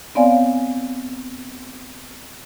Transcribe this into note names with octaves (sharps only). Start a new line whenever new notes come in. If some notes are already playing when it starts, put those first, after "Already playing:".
B3 C4 C#5 D5 F5 G#5